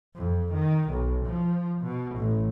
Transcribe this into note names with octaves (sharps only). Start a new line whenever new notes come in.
F2
D#3
B1
F3
B2
A1